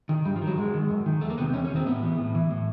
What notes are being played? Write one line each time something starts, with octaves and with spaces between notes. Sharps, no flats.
D#3
G2 G3
F3
D#3
F#3
F#2 G#3
D#3
F#2
D#3
E2 A3
A#3
C3 D#3 B3
E2 C#4
C#4
C3
D#3 C4
A2 B3
E3
A2
E3
A2